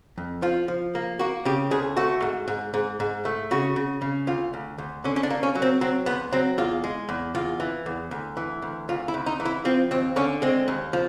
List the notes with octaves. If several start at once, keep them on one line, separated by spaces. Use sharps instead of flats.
F2
F3 F4
F3
A#3
A#3 F#4
C#3 G4
D2 G#4
A3 F#4
G#2
G#2
G#2
G#2
A3
C#3 F#4
C#3
C#3
D2 F4
D2
D2
D3 C#4
C#4
D4
A#3
C#4
F#3
C4
F#3 C4
D2 B3
F#3 C4
E2 F4
G#3
E2
E2 F4
E3
E2
D2
E3
D2
D2 F4
E4
D2
D#4
E3
E4
F3 C4
D#2 C4
D3 C#4
G#3 C4
D#2
F3